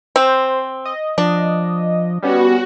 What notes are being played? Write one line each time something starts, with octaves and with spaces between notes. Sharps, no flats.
C4 C5
D#5
F3 D4
G3 B3 C#4 F#4